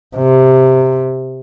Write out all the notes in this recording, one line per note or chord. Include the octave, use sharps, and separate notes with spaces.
C3